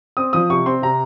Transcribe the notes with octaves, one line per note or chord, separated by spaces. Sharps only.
C4 D#6
F3 D#6
C3 C#6
C4 C6
C3 A#5